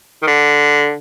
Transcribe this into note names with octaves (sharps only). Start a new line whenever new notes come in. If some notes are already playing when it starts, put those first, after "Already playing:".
D#3
D3